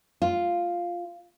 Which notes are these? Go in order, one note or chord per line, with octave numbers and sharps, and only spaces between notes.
F4